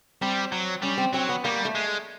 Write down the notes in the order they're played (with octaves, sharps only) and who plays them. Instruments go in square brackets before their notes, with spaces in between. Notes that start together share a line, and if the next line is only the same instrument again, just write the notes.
[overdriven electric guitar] G3 [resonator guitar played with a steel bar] C4
[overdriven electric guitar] F#3
[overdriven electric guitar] G3 [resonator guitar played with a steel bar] C#4
[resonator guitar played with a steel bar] C4
[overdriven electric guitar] F#3 [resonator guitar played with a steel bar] C4
[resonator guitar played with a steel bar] B3
[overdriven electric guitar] G3 [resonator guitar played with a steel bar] A#3
[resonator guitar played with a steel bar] A3
[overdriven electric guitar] G#3